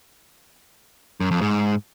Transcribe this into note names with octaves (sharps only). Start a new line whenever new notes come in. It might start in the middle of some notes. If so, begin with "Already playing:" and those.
F#2
F2
G#2